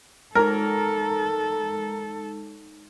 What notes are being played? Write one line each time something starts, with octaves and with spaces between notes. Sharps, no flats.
G#3 D#4 A4 A#4